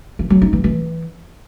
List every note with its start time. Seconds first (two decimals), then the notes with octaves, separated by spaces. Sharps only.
0.19 E3
0.30 F#3
0.42 D#4
0.53 E3
0.64 E3